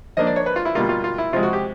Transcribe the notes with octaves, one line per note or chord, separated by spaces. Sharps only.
F3 A#3 D4 D#5
D5
C#5
B4
F4
E4
B2 G3 A#3 F4
F4
F4
E4
C3 F3 G#3 F4
F#4
G4